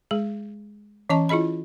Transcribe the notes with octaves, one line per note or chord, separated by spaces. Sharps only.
G#3 G#4
E3 C#4 D#5 A5 C#6
E4 F4 G#4 D#5 B5